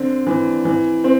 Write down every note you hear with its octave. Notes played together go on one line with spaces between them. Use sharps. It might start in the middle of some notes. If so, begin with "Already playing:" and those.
Already playing: D3 C4
E3
E3
C4